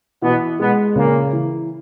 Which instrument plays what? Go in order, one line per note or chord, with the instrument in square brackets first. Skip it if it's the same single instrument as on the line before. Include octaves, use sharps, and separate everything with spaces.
[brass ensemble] B2 B3 [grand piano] E3
[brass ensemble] B2 B3 [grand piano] G#3
[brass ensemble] A#2 A#3 [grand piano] C#3
[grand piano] E3